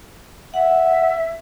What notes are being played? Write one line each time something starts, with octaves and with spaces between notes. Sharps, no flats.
E5 F#5